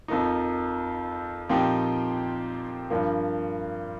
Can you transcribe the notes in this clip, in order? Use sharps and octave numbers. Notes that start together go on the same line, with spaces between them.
F2 F3 A#3 D#4
A#2 F3 C4 D#4 G4
G2 F3 A#3